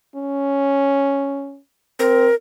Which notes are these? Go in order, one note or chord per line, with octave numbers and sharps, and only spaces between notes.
C#4
C4 A#4